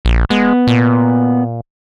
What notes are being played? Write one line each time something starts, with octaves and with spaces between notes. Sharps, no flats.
A#1
G#3 B3
A#2